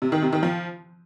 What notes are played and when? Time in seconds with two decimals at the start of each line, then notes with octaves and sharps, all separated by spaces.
0.02 C3
0.12 D#3
0.22 C3
0.33 D#3
0.43 F3